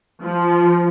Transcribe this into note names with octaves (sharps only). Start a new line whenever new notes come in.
F3